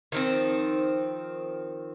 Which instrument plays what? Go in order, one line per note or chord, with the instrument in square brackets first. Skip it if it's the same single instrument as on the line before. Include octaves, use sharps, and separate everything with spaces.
[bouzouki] D#3 F3 C4